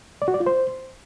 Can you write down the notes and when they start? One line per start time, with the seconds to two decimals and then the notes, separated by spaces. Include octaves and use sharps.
0.22 D5
0.28 F#4
0.34 D5
0.40 F4
0.46 C5